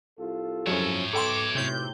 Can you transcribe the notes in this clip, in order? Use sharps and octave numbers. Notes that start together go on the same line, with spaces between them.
C2 F4 A4
F#2 F3 C#4 C#5 E5
B1 A4 G5 C6 D6
A2 C3 G6 F#7